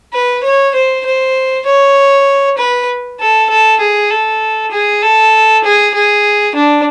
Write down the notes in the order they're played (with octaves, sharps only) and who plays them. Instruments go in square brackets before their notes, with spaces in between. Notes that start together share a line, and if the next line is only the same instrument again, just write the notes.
[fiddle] B4
C#5
C5
C5
C#5
B4
A4
A4
G#4
A4
G#4
A4
G#4
G#4
D4